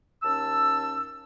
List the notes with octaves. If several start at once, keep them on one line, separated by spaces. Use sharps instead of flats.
D#2 C#4 A5 E6